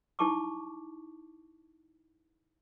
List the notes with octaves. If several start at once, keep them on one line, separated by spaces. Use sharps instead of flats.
D#4 E4 G4 A5 C#6 D6